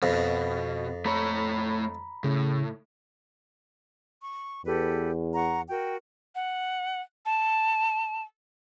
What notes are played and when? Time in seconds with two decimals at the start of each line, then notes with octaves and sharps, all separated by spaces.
0.03 F2 B2
1.06 A3 C#5 A#5 B5
2.24 A2 C#3
4.21 C#6
4.65 E2 G4 A4 B4
5.34 F#5 A#5 C#6
5.69 F#4 A#4 G5
6.35 F#5
7.26 A5